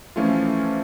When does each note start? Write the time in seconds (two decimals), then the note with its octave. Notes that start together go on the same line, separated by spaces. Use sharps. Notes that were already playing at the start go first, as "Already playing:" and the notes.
0.16 E3 F3 A3 C#4 E4 F4